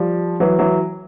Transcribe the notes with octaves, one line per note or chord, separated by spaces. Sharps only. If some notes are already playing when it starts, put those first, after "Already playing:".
Already playing: F3 G3
E3 F#3
E3 F#3